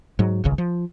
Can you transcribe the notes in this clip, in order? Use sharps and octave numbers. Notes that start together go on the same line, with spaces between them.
G#2 F#3
D#1 G#1 C#2 C#3
F3